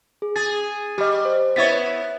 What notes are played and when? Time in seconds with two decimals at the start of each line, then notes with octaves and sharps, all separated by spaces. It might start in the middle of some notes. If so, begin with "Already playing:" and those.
0.22 G#4
0.36 G#4 A6
0.98 G3 G4 D#5
1.25 C5
1.56 B3 E4 C#5 E5 A6 B6